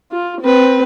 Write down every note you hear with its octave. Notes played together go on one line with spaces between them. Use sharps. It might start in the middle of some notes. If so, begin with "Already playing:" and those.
F4
C4 B4